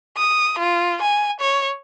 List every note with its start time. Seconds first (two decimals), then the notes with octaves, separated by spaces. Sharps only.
0.17 D#6
0.59 F4
1.02 G#5
1.40 C#5